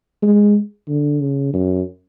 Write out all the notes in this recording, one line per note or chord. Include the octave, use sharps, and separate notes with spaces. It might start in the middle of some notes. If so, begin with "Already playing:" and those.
G#3
D3
C#3
F#2